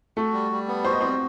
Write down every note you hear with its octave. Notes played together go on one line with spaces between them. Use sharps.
A3 F#4 A4
G3
G3
B3
F#4 C5
D#5
G3 C4 C5